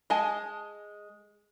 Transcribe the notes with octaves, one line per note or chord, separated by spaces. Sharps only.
G#3 D#5 G#5 A5